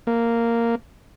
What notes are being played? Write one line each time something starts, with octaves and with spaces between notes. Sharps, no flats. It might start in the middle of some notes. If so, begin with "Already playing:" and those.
A#3